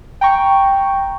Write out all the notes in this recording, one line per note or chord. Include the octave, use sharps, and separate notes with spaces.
G5 A#5 C#6